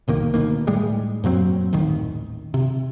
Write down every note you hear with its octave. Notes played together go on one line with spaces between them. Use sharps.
C2 A#2 D#3 A#3
D2 B2 D#3 A#3
A2 G3 G#3
F#2 A#2 F#3 C4
D#1 A1 D#3
C3